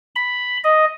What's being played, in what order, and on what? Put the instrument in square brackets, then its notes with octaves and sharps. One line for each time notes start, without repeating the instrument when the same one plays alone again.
[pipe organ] B5
D#5